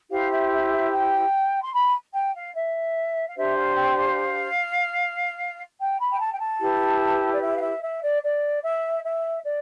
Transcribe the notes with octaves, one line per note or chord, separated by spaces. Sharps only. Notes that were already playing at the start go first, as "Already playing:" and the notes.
E4 G4 C5 F5
E5
E5
E5
G5
C6
B5
G5
F5
E5
F5
D4 G4 C5 E5
F5
G5
F5
G5
B5
G5
A5
G5
A5
E4 G4 B4
D5
E5
F5
E5
E5
D5
D5
E5
E5
D5